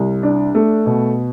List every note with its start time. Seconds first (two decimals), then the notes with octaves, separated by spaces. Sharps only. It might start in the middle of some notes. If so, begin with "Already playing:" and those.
Already playing: C2
0.23 D4
0.55 A3
0.86 B2